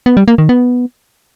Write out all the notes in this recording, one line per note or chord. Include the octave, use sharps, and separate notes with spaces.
B3
G3
A#3
D#3
B3